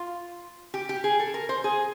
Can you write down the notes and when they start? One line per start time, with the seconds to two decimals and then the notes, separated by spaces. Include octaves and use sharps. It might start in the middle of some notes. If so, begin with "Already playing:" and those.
Already playing: F4
0.74 G4
0.89 G4
1.04 G#4
1.20 A4
1.34 A#4
1.49 C5
1.64 G#4